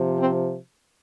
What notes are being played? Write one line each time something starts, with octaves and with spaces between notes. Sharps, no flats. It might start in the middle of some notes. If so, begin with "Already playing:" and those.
Already playing: C3 F3
C4